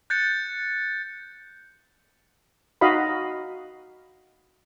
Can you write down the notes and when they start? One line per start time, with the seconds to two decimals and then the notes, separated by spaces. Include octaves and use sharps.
0.10 F#6 G6 A6 C#7
2.81 D#4 F#4 D#5 F5 B5